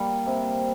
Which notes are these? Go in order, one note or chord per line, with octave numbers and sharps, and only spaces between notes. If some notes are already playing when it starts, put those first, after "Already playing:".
Already playing: G3 A#3
C3